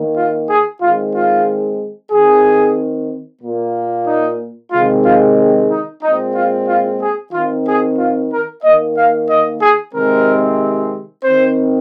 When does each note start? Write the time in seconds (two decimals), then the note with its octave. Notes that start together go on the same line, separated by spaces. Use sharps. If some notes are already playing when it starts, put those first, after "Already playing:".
Already playing: D#3 A#3
0.15 F4
0.49 G#4
0.81 D#3 G#3 C4 F4
1.14 F4
2.11 D#3 C4 G#4
3.42 A#2 A#3
4.07 D#4
4.72 C3 D#3 G#3 C4 F4
5.05 F4
5.70 D#4
6.02 A#2 G#3 C4 D#4
6.35 F4
6.68 F4
7.01 G#4
7.33 D#3 C4 F4
7.66 G#4
7.98 F4
8.31 A#4
8.63 D#3 A#3 D#5
8.96 F5
9.29 D#5
9.60 G#4
9.93 C3 D#3 G#3 C4 A#4
11.24 D#3 C4 C5